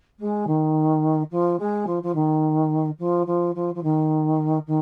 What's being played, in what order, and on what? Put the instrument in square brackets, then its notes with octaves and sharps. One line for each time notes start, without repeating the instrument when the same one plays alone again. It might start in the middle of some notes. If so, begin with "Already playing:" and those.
[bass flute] G#3
D#3
F3
G#3
F3
F3
D#3
F3
F3
F3
F3
D#3
D#3